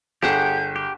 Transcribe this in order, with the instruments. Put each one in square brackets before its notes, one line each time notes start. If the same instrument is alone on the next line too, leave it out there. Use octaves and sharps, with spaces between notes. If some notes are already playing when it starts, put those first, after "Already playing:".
[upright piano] G1 E7 [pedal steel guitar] G4 [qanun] G#4 F#5 G5 [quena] G6
[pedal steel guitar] G4